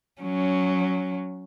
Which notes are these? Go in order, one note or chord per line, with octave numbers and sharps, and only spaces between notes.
F#3 C#4